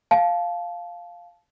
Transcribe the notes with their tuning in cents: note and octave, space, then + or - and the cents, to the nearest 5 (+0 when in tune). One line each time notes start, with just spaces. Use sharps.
F5 +0 A5 -20